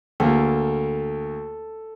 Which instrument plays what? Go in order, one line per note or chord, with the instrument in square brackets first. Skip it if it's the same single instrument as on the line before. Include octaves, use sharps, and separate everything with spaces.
[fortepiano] D2 A#3 [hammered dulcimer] A4